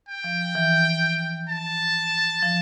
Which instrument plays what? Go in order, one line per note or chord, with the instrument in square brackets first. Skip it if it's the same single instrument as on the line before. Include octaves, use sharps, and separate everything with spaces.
[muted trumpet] G5
[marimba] F3
E3
[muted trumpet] A5
[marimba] F3